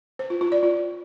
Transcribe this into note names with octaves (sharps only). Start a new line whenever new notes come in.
C5
F4
F4
D5
F4